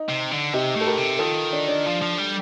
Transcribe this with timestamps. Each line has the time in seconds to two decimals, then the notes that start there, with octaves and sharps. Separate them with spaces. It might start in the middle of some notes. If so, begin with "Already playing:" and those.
Already playing: D#4
0.09 C3
0.31 D3
0.53 C3 D#4 G4
0.76 A2
0.81 A4
0.86 G4 A#4
0.97 C3
1.19 D#3 F4 A4
1.53 D4
1.68 D4
1.86 F3
2.02 F3
2.18 G3